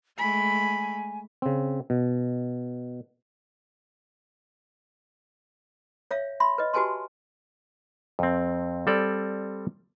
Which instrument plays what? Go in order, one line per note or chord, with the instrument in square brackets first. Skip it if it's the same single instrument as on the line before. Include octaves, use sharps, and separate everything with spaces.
[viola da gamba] G#3 A3 [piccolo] G#5 [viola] B5
[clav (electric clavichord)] C#3 C4
B2
[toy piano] C#5 E5 F5
E5 B5 C6
B4 D#5
F#4 G4 B4 G#5 A5 C6
[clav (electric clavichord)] F2 C4
G3 C4 A4 D5